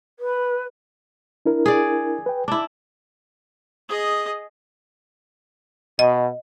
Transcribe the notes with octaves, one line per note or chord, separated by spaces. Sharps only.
B4
D4 E4 A#4
G#4 D5
B4 G5
D4 E4 D6
G#4 D#5
B2 D#5